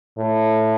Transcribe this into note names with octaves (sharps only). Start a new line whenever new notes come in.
A2